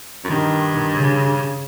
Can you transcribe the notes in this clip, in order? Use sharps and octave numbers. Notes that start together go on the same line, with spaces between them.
F#2
G2 D#3
C#3